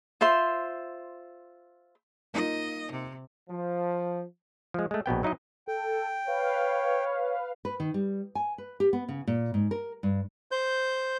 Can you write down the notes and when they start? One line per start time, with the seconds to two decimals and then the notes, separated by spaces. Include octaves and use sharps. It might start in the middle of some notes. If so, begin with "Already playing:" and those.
0.21 F4 C5 E5 C6
2.34 A#3 D#4 F4 D#5
2.92 C3
3.49 F3
4.74 F3 G#3
4.91 G#3 A3
5.06 A#1 B2 B3 G5
5.23 F#3 D#4 E4 D#5
5.68 A4 G5
6.28 B4 C#5 F5
7.65 B4
7.80 D#3
7.94 G3
8.35 G#5
8.58 B4
8.80 G4
8.93 B3
9.09 C#3
9.27 A#2
9.54 G#2
9.71 A#4
10.03 G2
10.52 C5 G6